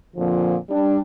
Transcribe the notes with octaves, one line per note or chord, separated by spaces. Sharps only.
F2 A#2 D3 F3
G3 D4